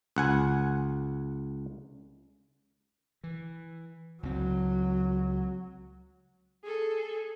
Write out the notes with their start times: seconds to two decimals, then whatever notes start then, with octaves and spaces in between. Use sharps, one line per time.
0.16 C#2 F#5 G#5
3.24 E3
4.23 C#2 F#3 C4
6.64 G#4 A4